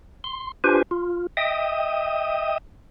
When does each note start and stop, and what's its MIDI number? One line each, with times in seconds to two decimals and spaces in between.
0.24 0.52 84
0.64 0.82 62
0.64 0.82 65
0.64 0.82 67
0.64 0.82 71
0.64 0.82 72
0.64 0.82 80
0.91 1.27 65
1.37 2.58 75
1.37 2.58 76
1.37 2.58 79
1.37 2.58 87